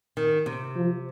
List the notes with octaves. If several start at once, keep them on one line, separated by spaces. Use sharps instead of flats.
D#3
C3
F3